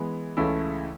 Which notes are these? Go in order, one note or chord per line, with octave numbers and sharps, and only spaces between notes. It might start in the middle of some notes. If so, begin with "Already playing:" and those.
Already playing: E3 G#3 B3
C#2 C#3 E3 A3 E4